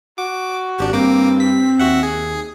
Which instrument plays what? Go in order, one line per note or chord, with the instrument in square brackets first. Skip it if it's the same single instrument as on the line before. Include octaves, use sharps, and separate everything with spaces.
[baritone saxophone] F#4 [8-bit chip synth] D6
[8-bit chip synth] G#1 D4 [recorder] G4
[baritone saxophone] G2 [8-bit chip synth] A#3 D6 [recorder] C4
[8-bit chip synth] B6
[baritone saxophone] D#2 [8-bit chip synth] F#4 E5 F#5
[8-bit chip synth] G#4